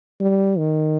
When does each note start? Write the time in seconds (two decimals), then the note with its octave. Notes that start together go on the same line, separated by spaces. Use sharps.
0.21 G3
0.58 D#3